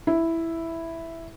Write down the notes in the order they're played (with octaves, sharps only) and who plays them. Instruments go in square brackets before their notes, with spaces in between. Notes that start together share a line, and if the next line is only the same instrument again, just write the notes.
[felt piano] E4